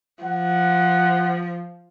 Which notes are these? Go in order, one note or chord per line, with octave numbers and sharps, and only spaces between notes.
F3 F#5